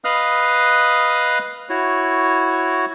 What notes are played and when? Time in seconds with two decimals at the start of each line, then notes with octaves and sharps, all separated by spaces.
0.04 B4 D#5 F5 D#6 F6 F#6
1.70 E4 F#4 C#5